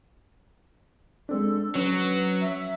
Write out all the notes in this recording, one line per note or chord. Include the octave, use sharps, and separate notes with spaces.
G#3 C4 D4 A4
F#3 C#4 B4
E5